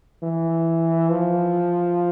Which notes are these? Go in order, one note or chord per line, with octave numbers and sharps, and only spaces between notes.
E3
F3